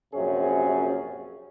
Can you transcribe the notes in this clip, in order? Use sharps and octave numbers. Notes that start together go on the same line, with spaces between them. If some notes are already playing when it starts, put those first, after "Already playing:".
A#1 F#2 C3 C#4 G#4